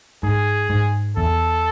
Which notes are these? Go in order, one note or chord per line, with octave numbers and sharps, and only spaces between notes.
G#2 G#4
G#2
E2 A4